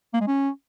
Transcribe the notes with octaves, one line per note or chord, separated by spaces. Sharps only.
A#3
G#3
C#4